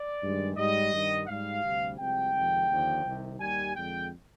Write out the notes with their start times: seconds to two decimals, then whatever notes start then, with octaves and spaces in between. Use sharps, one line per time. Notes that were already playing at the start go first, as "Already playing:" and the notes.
Already playing: D5
0.21 G2 D#3 G#3
0.56 G#2 G3 D#5
0.92 G2 D#3 G3
1.27 G#2 G3 F5
1.63 D2 C3 G3
1.98 C2 C3 F3 G#3 G5
2.34 F2 C3 D#3 G#3
2.69 D#2 D3 F3
3.05 C2 C3 D#3
3.40 D#2 D#3 G3 G#5
3.75 F2 D3 G#3 G5